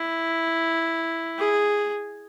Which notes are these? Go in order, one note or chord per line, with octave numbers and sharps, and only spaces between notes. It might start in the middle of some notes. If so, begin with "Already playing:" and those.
Already playing: E4
G#4